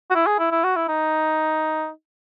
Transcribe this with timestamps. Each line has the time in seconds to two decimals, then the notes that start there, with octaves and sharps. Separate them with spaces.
0.10 F#4
0.15 E4
0.27 G#4
0.39 E4
0.51 E4
0.64 F#4
0.76 E4
0.88 D#4